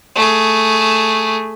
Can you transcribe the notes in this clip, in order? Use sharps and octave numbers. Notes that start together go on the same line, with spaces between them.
A3 G#4